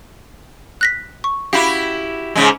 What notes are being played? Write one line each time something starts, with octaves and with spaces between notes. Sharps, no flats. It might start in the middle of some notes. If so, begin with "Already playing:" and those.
F#6 A#6 B6
C#6
E4 F#4 G4 F5 B5
G#2 C#3 G#3